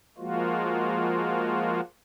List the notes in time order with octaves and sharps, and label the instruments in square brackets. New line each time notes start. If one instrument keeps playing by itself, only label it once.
[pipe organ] F3 G#3 A#3 F4 F#4